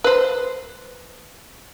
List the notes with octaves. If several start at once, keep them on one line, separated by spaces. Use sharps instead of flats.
B4 C5